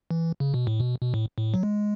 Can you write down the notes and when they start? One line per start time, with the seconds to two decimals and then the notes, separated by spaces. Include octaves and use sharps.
0.11 E3
0.40 C#3
0.54 B2
0.67 A2
0.80 B2
1.02 B2
1.14 A2
1.38 A2
1.54 F#3
1.63 G#3